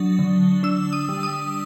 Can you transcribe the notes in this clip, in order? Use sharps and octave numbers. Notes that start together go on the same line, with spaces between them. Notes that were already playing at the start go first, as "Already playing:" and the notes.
Already playing: F#3 D4 D#6
D3
D4 E6
D#6
G3
D#6